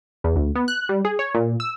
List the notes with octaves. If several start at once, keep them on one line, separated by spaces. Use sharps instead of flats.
E2
D2
B3
F#6
G3
G#4
C#5
A#2
E6